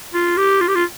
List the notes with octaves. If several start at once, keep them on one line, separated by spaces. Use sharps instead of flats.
F4
G4
F4
G4
F4